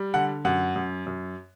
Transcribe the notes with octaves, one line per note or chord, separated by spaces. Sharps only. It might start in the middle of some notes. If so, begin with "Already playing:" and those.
Already playing: G3
D3 F#5
F#2 F#5
F#2
F#2